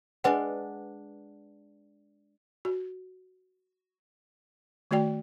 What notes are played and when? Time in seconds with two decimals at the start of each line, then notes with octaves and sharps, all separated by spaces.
0.24 G#3 D4 B4 F#5
2.65 F#4
4.91 D#3 A3 F#4 D5 G5